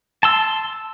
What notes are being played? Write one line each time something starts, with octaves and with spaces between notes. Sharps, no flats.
A5 C6 E6